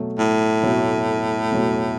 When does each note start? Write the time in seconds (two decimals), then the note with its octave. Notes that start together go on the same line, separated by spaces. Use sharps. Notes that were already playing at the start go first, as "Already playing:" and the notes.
Already playing: B2 F#3 A3
0.19 A2
0.63 B2 F#3 A3
1.52 B2 F#3 A3